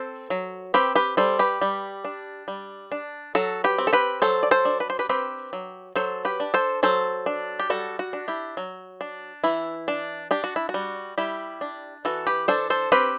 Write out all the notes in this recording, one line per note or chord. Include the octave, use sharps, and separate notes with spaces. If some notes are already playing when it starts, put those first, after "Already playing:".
Already playing: C4 A4 C5
F#3
C4 G4 B4
G4 B4
G3 A4 C5
G4 B4
G3
D4
G3
D4
F#3 F#4 A4
G4 B4
C4
A4
G4 B4
F#3 A4 C5
D5
A4 C5
D4
B4
C5
G4 B4
C4 G4 B4
F#3
F#3 A4 C5
G4 B4
D4
A4 C5
F#3 A4 C5
D4
G4
G3 F#4 A4
F#4
D4
E4 G4
F#3
D4
E3 E4
D4
D4 G4
F#4
E4
F#4
G3
G3 E4 G4
D4
E3 F#4 A4
G4 B4
D4 A4 C5
A4 C5
C4 G4 B4